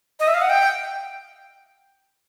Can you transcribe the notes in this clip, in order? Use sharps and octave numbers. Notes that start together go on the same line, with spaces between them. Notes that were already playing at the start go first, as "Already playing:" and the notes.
D#5
E5
F5
F#5
G5